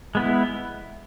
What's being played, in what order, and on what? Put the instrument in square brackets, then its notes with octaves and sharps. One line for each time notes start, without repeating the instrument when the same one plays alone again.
[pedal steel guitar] G#3 B3 E4